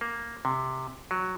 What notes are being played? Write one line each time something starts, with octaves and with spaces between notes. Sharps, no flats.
A#3
C3
F#3